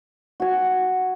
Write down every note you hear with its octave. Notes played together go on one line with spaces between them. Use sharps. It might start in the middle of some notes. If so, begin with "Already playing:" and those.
F#4 G#5